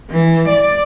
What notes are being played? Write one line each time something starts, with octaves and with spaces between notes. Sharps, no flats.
E3
D5